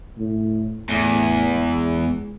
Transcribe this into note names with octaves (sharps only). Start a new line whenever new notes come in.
A2
E2 A2
G#3